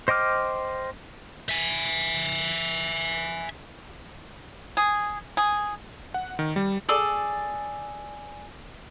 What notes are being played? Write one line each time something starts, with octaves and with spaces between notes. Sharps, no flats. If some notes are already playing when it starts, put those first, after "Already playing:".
C5 D#5 G5 D6 F6
E5 G#5
G#4
G#4
F#5
D#3
G3
G#4 A4 D5